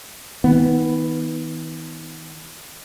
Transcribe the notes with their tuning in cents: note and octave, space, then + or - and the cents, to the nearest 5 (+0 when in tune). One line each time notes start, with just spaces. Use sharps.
D#3 +40 B3 +0